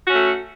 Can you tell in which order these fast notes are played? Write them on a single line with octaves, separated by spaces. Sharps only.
F#4 C#4 A3